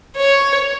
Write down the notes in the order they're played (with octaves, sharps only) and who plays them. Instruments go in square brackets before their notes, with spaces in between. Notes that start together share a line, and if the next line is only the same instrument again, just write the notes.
[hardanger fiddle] C#5